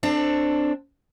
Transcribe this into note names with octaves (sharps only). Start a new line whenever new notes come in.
C4 D4 A4